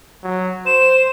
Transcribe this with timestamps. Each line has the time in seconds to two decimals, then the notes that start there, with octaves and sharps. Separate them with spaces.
0.23 F#3
0.66 C5 E7